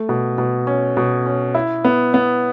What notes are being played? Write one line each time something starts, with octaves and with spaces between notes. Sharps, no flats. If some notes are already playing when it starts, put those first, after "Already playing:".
Already playing: A3
B2
B2
C#4
B2
C#4
E4
B3
B3